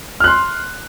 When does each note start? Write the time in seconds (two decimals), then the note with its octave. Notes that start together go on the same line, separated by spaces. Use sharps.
0.20 F6
0.24 F#6
0.28 C6